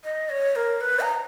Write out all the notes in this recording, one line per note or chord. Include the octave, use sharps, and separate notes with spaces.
D#5
C#5
A#4
B4
A#5